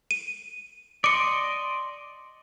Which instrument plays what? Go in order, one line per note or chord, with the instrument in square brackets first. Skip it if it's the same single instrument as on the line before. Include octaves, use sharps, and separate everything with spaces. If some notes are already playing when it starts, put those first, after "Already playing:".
[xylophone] D#7
[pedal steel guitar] D5 D#5 C6 [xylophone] D6 C#7